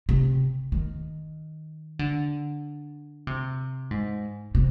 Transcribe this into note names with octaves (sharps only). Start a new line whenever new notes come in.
C3
D#3
D3
C3
G#2
C3